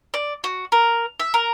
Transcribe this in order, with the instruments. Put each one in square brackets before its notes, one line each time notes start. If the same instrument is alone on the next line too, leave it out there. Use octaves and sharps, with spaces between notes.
[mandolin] D5
F#4
A#4
E5
A#4